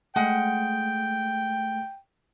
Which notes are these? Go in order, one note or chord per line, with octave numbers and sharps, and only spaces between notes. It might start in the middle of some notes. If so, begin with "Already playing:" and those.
G#3 A3 F#5 G5